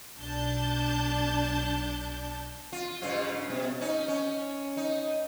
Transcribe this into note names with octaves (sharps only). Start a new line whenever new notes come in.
B1 D4 A5 G6
F4
G2 C#3 F4
B2
C#4 D#4
C#4
D#4